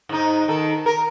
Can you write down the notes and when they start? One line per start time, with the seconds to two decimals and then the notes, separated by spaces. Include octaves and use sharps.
0.09 G#2 D#4
0.48 D#3 A4
0.86 A#4